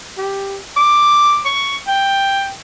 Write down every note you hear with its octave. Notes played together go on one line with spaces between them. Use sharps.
G4
D6
C#6
G5